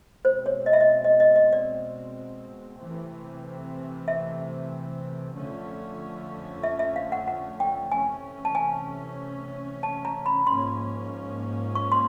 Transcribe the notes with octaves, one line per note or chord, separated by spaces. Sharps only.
B2 G#3 C4 C5
C#5
D#5
E5
D#5
D#5
D#5
D#5
D5
C3 E3 A3 C4
E5
F2 D3 F3 A3 C#4
E5
E5
F5
F#5
F#5
G5
C3 E3 A3 C#4 G#5
A5
G#5
A5
A#5
B5
G#2 F3 A#3 C#4 C6
C#6
C6